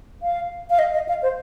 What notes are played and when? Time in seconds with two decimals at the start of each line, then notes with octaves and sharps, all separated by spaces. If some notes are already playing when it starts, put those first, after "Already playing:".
0.22 F5
0.70 F5
0.79 D#5
0.94 D#5
1.08 F5
1.23 C5